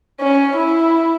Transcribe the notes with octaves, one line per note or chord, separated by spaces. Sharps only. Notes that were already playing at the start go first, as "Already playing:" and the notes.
C#4
E4